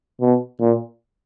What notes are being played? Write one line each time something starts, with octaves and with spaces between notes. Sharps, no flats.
B2
A#2